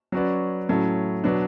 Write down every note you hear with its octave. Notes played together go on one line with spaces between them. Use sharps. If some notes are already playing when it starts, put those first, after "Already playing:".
F#3 C#4 F#4 B4 D5
A2 F#3 C#4 E4 A4
B2 F#3 B3 D4